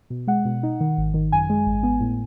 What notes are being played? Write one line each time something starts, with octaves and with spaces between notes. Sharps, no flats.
B2
G#3 F#5
B2
D#4
D#3
G#1
D#3
F#2 G#5
G#3
G#1
B3
A2